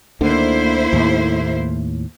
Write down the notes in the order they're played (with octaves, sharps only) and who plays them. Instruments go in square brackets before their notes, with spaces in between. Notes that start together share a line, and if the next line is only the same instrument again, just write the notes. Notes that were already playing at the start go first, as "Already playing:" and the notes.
[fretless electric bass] D2 D3 D#3 [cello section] A#3 E4 C5
[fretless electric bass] D#2 A2